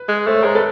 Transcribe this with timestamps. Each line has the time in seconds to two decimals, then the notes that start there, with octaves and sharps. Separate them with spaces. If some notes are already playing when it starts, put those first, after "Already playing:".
Already playing: B4
0.08 G#3
0.27 A3 C5
0.34 C#5
0.42 G#3 A#4 C5
0.55 A4 B4